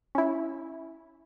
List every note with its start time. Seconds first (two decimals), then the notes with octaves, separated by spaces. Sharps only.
0.15 C#4 E4